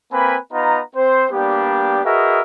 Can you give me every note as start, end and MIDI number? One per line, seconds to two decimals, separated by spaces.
0.12 0.37 58
0.12 0.37 60
0.12 0.37 71
0.12 0.37 80
0.12 0.37 83
0.53 0.80 59
0.53 0.80 63
0.53 0.80 65
0.53 0.80 82
0.95 1.25 60
0.95 1.25 72
1.31 2.00 55
1.31 2.00 58
1.31 2.00 59
1.31 2.00 62
1.31 2.00 67
2.05 2.41 66
2.05 2.41 68
2.05 2.41 70
2.05 2.41 71
2.05 2.41 75
2.05 2.41 76